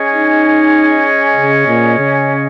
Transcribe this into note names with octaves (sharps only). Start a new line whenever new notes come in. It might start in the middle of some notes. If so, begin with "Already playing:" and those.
Already playing: C#4 G#4 D#5
D#4
C#3
A#2
C#3